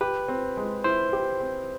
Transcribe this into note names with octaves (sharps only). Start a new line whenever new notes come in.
G4 B4
C4
G#3
E4 C5
G4
C4